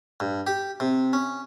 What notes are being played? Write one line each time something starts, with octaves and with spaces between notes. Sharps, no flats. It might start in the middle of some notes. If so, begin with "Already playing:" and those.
G2
G4
C3
C#4